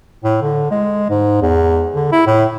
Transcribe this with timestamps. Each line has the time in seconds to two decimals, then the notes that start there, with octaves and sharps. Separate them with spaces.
0.24 A2
0.42 D3
0.71 G#3
1.10 G#2
1.42 E2
1.95 D3
2.12 E4
2.27 A2